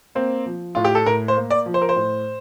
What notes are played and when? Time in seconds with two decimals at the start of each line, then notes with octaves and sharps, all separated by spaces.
0.15 A#3 C4
0.46 F3
0.75 A2 F4
0.85 G4
0.95 A4
1.06 A2 A#4
1.28 C5
1.36 A#3
1.50 D5
1.66 F3
1.74 C5
1.82 A#4
1.89 C5
1.96 A2